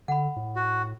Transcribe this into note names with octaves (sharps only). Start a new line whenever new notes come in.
D3 F#5 B5
A2
F#4